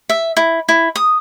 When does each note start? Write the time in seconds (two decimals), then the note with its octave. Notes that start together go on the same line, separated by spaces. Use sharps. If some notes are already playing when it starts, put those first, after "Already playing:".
0.09 E5
0.37 E4
0.69 E4
0.96 D#6